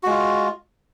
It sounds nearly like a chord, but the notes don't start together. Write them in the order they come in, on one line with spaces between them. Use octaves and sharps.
F#4 G#3 F4